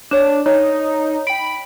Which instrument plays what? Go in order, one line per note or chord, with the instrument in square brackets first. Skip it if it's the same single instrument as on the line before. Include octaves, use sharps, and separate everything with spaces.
[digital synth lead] D4 [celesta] C#5 E7
[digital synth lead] D#4 [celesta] C#5
[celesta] G5 D7 [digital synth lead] B5